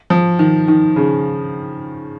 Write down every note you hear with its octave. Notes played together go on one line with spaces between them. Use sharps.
F3
D#3
D#3
C#3